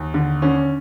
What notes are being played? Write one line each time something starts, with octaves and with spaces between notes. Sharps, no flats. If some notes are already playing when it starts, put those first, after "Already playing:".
Already playing: D#2
D3
D3 C#4